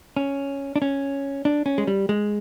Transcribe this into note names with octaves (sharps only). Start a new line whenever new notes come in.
C#4
D4
C#4
D4
C#4
G#3
G3
G#3